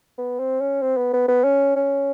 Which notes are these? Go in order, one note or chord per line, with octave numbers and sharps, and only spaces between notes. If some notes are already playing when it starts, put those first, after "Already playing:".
B3
C4
C#4
C4
B3
B3
B3
C#4
C#4